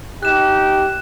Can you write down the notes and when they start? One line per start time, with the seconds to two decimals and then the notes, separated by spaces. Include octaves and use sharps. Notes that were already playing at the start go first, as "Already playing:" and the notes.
0.23 D#4 G4 F#6 E7